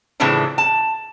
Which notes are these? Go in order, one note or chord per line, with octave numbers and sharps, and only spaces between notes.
A2 C#3 E3 F3 D4
A5